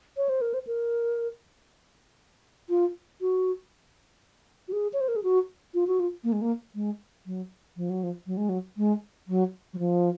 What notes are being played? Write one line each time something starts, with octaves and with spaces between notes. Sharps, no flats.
C#5
C5
A#4
C5
A#4
F4
F#4
F#4
G#4
C#5
C5
A#4
G#4
F#4
F4
F#4
F4
A#3
G#3
A#3
G#3
F#3
F3
F#3
F3
F#3
G#3
F#3
G#3
F#3
F#3
F3